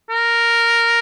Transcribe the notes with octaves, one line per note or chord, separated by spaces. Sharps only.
A#4